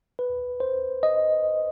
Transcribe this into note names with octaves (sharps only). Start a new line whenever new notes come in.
B4
C5
D#5